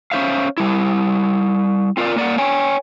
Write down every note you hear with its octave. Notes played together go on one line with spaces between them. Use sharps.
C#4 E4 C5 E5 F5
G3 E4
C4 F4 A#4 C#5 D5
A#3 D5 F#5
C#5 G5 G#5